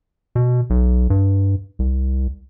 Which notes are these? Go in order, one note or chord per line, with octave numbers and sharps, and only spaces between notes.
B2
B1
G2
C2